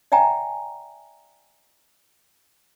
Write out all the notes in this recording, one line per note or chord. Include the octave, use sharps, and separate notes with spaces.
D5 E5 G5 G#5 A#5